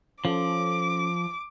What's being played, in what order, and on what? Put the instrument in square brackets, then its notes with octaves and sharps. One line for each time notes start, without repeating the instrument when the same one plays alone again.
[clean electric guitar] F3 [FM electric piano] C#4 A4 [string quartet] D6